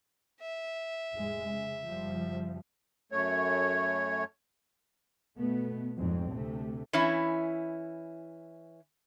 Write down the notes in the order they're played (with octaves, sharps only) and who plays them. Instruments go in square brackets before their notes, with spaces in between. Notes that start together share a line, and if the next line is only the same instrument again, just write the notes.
[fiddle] E5
[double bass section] F1 A2 G#3
C#3
F#1 F3 G3
[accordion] F#2 A3 C#5
[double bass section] B2 A3 B3
A#1 F2 G#2 F#3 C4
D2 C3 A3
[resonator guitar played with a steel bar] E3 C#4 E4